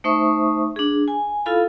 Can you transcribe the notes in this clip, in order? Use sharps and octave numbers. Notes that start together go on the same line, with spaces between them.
A3 D#4 C5 E5 C#6 D#6
D4 G#4
G#5
E4 F4 A4 F5 B5